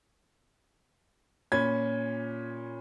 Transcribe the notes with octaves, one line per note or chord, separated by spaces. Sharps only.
A#2 C#4 B5 G#6